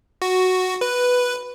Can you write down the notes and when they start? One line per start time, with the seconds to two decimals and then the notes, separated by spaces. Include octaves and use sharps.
0.22 F#4
0.81 B4